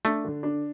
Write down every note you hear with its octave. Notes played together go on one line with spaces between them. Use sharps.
A3 D4
D3
D4